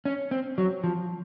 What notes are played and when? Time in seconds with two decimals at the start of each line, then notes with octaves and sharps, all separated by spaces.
0.05 C#4
0.31 C4
0.58 F#3
0.84 F3